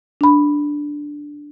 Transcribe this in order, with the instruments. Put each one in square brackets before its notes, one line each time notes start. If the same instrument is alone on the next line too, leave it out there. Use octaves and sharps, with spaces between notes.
[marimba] D4 B5